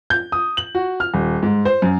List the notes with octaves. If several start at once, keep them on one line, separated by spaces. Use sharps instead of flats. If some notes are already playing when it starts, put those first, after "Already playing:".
G6
D#6
F#7
F#4
F6
D#1
G#2
C5
F#2